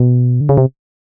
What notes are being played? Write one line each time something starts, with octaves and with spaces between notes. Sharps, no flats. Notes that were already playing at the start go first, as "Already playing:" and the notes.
Already playing: B2
D3
C#3
C3